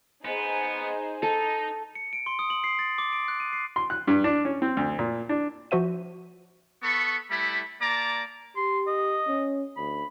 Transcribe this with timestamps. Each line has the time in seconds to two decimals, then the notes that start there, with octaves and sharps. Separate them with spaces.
0.25 B3 D#4 G#4 C5
1.23 D#4 A4
1.95 C#7
2.13 D7
2.26 C6
2.39 D#6
2.50 F#7
2.64 C7
2.79 A6
2.98 D6
3.13 D7
3.28 F#6
3.40 D#7
3.53 C7
3.76 C6
3.90 F#6
4.07 G2
4.24 D4
4.45 C#4
4.62 C4
4.77 D2
4.99 A#2
5.29 D4
5.71 F3 F#4 C5 E5 D#7
6.83 B3 A4 B5 C#6
7.31 G3 A3 E4 B5
7.81 A#3 D5 A5 A#5 D6
8.57 G4 C6
8.88 D#5
9.27 C#4
9.77 D2 B5